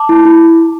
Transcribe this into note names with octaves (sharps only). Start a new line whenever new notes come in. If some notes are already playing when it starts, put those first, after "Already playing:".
Already playing: A5 D6
E4
E4